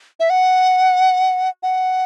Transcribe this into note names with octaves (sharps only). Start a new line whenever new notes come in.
E5
F#5
F#5